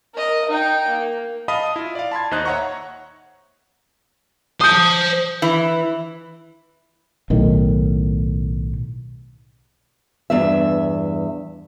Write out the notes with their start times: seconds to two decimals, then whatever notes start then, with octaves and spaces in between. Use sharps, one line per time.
0.14 A#4 D#5
0.49 D#4 G5
0.88 A#3
1.48 D#5 F5 A5 B5 D#6
1.76 E4 F4
1.95 D5 F5
2.12 A5 B5 C6 G#6
2.31 D#2 D#4 C5 D#5 F#6
2.45 C#5 E5 F#5 A#5 C#6
4.61 C5 A5 D#6 G6
5.42 E3
7.30 B1 A2 D#3
10.30 E2 G2 E5